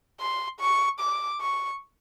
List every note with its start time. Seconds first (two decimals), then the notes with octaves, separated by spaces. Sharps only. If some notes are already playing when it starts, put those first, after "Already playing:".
0.20 C6
0.60 C#6
1.00 D6
1.41 C#6